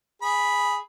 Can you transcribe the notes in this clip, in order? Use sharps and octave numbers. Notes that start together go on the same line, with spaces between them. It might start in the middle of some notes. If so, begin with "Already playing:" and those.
G#4 B5